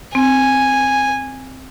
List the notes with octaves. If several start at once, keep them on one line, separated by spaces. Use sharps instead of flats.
C4 G#5